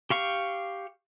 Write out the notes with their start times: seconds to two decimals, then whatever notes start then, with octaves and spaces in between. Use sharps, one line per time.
0.10 G4 F5 C#6